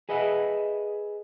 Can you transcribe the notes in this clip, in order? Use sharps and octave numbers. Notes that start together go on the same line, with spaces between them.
G#4 B4 D#5 E5 F#5